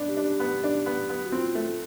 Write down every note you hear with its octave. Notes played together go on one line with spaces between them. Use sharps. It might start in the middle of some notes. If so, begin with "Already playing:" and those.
Already playing: B3 D4
G4
D4
B3
D4
B3
B3
F#4
C4 F4
A3